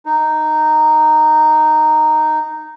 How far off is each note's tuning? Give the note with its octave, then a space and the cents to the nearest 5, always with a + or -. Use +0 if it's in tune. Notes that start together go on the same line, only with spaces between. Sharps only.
D#4 -10